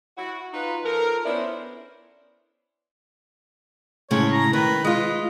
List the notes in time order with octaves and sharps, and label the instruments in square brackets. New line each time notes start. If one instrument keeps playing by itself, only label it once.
[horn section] E4 F#4
D#4 F4 B4
F3 A4 A#4
B3 C#4 D4 E4 C5
[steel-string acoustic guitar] A2 C#3 G#3 [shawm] C#5
[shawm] A#5
[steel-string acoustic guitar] D#3 [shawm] B4
[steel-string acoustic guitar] G#3 F4 [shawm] D#5